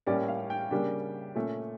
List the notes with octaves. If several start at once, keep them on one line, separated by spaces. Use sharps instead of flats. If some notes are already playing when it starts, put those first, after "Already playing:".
A2 G3 A#3 C#4 D5
F5
G5
C#3 G3 A#3 D4
A#2 A3 C#4